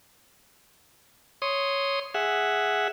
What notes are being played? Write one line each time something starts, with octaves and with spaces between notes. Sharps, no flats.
C#5 C6 D#6
G#4 E5 F#5